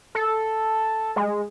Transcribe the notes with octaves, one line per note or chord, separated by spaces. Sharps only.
A4
G#3